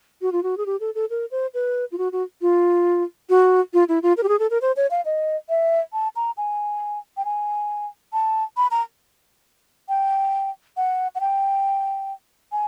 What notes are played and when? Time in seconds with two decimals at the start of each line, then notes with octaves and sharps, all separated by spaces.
0.22 F#4
0.32 F4
0.43 F#4
0.57 G#4
0.66 G4
0.80 A4
0.95 A4
1.10 A#4
1.31 C5
1.54 B4
1.92 F4
1.98 F#4
2.12 F#4
2.41 F4
3.29 F#4
3.74 F4
3.89 E4
4.03 F4
4.17 A#4
4.23 G4
4.29 G#4
4.39 A4
4.50 A#4
4.62 C5
4.76 C#5
4.91 F5
5.05 D#5
5.49 E5
5.93 A5
6.16 A#5
6.37 G#5
7.17 G5
7.25 G#5
8.13 A5
8.57 B5
8.71 A#5
9.89 G5
10.77 F#5
11.15 F#5
11.20 G5
12.52 G#5